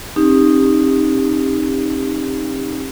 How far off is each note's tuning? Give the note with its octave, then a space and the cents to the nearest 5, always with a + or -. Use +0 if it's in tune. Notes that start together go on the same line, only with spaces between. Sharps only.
C4 +45 D#4 +0 G4 +25